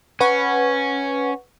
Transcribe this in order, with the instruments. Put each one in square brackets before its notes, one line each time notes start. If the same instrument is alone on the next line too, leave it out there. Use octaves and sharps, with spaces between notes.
[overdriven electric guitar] C#4 [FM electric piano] B4 F#5 C#6